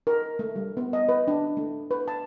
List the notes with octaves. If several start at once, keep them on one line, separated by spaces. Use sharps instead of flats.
A#4
A3
G3
B3
D#5
B4
D4
A3
B4
A5